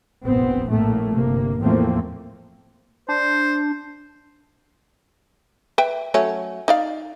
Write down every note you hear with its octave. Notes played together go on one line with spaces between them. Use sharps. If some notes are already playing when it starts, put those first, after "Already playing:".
F1 A#1 B3 C4
A#1 A2 A3 A#3
G1 C3 A#3
E2 A2 F3 A3 A#3 C4
D4 C5
B4 E5 G5
F#3 A3 C#4
D#4 D5 F5